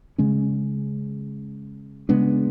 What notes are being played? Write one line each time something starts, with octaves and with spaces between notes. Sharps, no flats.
C#3 G#3 C#4
C#3 G#3 B3 D4